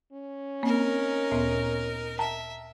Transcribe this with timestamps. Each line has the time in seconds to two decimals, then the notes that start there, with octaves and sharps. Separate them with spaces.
0.13 C#4
0.63 A#3 C4 D#4 A#4
1.31 D2 A#2 B3
2.19 E5 G5 A5 A#5